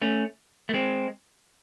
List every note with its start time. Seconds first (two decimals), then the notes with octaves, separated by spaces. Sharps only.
0.02 A3 C#4
0.69 A3
0.74 G#3 C4